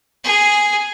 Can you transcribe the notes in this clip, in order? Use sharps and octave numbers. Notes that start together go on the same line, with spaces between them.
G#4